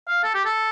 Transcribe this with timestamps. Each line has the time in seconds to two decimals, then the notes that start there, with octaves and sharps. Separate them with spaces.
0.08 F5
0.24 A4
0.35 G4
0.45 A4